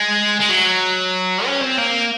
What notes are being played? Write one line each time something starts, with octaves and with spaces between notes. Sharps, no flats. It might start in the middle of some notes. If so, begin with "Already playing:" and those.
Already playing: G#3
G#3
F#3
C#4
C4
A#3